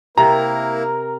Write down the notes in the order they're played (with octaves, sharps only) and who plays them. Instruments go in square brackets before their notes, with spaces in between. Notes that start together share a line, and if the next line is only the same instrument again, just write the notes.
[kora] C3 [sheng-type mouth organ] A#3 E4 [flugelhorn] A#4 [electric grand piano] A#5